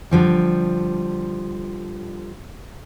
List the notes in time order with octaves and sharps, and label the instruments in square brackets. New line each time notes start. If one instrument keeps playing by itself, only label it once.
[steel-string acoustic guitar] D3 F3 G3